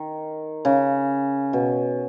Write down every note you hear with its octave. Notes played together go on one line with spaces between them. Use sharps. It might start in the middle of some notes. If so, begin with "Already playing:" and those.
Already playing: D#3
C#3
B2